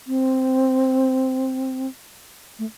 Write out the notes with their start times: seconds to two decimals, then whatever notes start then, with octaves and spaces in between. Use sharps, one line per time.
0.07 C4
2.59 A3